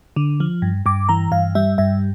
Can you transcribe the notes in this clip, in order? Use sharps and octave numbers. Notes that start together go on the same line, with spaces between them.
D3
F3
G2
G2 D6
E3 A#5
G2 F5
G3 E5
G2 E5